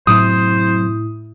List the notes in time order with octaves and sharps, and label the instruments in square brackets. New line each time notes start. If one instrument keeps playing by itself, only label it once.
[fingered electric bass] F#2 C3 F#3 [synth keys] A2 E4 [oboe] C5 [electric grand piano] D#6